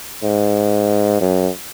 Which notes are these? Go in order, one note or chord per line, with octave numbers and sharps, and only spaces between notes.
G#2
F#2